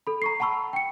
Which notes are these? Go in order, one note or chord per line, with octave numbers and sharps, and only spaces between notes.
A4 B5
A#5 C#6 C7
F#5 A5 B5 C#6 E6
G5 C#7